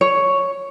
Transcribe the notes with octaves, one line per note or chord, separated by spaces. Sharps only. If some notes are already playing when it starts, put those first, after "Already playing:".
C#5